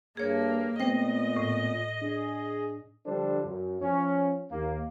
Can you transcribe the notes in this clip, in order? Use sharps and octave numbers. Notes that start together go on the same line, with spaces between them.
G2 A#3 G#4 C#5
A#2 A3 B3 C4 C5 D#5 G5
A2
D4 G#4
D3 F3 G3 D4 A4 C5
F#2
F3 C#4
D#2 A#3